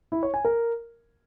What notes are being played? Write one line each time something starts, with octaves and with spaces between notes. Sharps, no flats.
E4
C#5
G#5
A#4